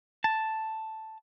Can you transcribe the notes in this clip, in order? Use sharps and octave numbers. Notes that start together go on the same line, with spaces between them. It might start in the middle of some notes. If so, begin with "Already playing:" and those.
A5